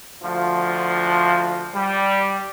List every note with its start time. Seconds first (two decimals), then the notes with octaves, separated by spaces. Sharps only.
0.22 D2 F3
1.74 G3